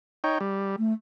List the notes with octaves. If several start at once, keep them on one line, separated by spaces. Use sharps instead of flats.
D#4 C#5 G5
G3
A3